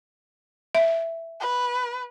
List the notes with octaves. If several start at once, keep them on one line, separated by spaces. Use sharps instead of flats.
E5
B4